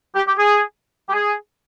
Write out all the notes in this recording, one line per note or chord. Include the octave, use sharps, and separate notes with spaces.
G4
G4
G#4
G4
G#4